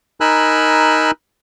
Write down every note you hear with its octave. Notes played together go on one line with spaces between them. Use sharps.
D#4 A#4 G#5 B5 E6 F#6